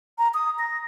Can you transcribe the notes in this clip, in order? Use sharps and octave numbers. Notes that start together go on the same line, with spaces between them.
A#5
D#6
A#6